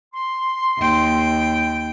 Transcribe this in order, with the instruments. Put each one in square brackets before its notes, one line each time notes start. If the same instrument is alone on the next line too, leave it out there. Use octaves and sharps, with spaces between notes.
[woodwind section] C6
[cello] D#2 G5